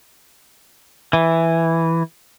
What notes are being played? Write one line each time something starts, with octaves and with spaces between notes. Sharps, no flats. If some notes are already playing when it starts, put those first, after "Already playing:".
E3